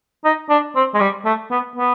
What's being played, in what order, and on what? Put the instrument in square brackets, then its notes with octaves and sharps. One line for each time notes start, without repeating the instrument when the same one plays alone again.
[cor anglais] D#4
D4
C4
G#3
G3
A3
B3
B3